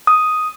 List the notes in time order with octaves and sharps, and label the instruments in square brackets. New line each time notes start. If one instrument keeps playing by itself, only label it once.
[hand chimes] D#6